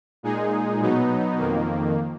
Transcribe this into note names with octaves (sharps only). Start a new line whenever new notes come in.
A#2 G#3 D#4 G#4
B2 F#3 B3 D#4
F2 D#3 A#3